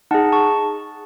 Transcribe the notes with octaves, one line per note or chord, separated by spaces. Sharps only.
D#4 G#4 F#5 A5
A5 C#6